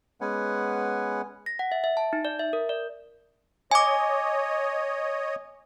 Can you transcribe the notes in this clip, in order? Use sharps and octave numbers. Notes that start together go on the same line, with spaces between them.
G#3 B3 C#4 B4 F#5 G#5
A#6
F#5
E5
E5
A5
D#4
D5
E5
A#4
D5
C#5 D#5 G#5 D6